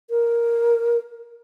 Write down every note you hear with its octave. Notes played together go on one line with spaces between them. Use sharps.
A#4